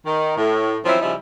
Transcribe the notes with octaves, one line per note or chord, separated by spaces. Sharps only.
D#3
A2
D#3 F3 F#3 C4 C#4 E4
C#3 F3 G3 D#4 E4